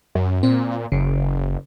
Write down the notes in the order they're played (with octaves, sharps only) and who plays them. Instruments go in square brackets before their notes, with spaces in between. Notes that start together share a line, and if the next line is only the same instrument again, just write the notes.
[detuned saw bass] F#2
[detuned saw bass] A#2 [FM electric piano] C4
[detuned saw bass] F#1 [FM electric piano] C#3